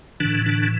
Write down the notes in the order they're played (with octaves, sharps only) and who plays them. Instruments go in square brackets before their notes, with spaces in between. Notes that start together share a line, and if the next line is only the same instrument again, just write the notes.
[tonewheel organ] A2 D3 E3 D4
D3 D4